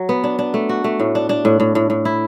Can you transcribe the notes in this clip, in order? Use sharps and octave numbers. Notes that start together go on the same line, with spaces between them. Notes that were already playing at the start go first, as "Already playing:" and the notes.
Already playing: F#3
B3
D4
D4
A3
F#4
A3
A2
D4
D4
A2
A2
A2
A2
E4